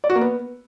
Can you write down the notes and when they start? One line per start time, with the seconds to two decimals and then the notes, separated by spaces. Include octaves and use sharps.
0.04 D5
0.10 F#4
0.15 A#3
0.21 B3